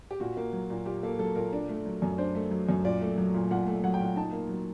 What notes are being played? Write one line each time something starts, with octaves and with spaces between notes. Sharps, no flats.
G4
A#2 F#4
A#3
F#3
A#2
A#2 G4
A#3 A4
F#3 A4
A#2 A#4
D4
A3
F#3
F#2
D4 C5
A3
F#3
F#2
A#2 D5
A3
F#3
A#2
A#2 F#5
A3
F#3 F#5
G5
A#2
F#5
D#4 A5
A#3
F#3